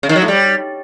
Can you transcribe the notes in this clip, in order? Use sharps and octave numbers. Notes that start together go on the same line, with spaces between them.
C#3
D#3
F#3
A2
G3